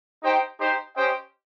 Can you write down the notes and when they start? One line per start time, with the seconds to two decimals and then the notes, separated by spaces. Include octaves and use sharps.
0.21 D#4 G4 C5 G5
0.59 D#4 G4 C5
0.94 C#4 G4 C5 D#5 G5